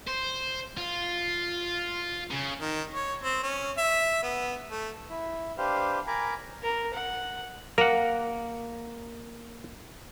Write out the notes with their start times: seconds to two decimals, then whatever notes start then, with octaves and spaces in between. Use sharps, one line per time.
0.08 C5
0.77 F4
2.31 C#3
2.61 D#3
2.94 C#5
3.22 C4
3.43 C#4
3.78 E5
4.23 B3
4.70 A3
5.10 E4
5.58 D4 G4 B4 C5 F5
6.07 A#4 G#5 A#5 B5 D6
6.63 A#4
6.94 F#5
7.78 A#3 A#4 F#5